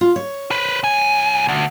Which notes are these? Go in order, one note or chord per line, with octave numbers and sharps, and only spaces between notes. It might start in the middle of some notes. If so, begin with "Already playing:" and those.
F4
C#5
B4 C5
C2 G#5
D2